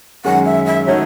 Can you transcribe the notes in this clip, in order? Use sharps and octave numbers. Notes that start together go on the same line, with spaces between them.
F#2 D#3 G#3 C#4 F#5
E5
E5
D#3 A3 D#4 F#4 C#5